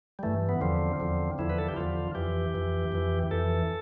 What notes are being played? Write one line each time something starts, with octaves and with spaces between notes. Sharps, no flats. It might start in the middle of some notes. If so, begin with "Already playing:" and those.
G3
G2 E3 A3
B3
E2 D3 F3 C4
E2 D3 F3
E2 D3 F3 E4
B4
A4
G4
E2 D3 F3 F4
F2 E3 G4
F2 E3
F2 E3
F2 E3 A4